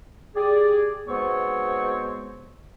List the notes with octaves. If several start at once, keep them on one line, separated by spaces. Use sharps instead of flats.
G4 G#4 D5
G#2 B2 G#3 B3 C4 C#5